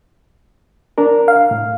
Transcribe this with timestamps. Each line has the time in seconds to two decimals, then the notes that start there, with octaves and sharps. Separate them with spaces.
0.98 D4 A#4
1.28 F5
1.51 A2